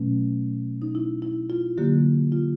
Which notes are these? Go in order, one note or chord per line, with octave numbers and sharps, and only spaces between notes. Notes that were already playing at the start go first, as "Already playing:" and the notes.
Already playing: B2 F#3 A3 C#4
D#4
E4
E4
F4
D3 F#3 A#3 G4
F4